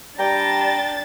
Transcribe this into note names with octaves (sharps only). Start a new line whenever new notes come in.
G3 D4 G5 A#5 A6